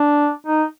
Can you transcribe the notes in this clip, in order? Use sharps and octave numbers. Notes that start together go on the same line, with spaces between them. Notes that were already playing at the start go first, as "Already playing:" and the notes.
Already playing: D4
D#4